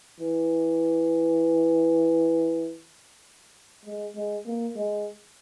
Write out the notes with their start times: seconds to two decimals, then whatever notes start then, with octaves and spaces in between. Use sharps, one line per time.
0.20 E3
3.85 G#3
4.16 G#3
4.46 A#3
4.76 G#3